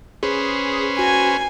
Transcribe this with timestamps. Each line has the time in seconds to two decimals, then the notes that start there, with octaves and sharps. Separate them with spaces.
0.23 C#4 G#4 B4 C5
0.99 F#4 G#5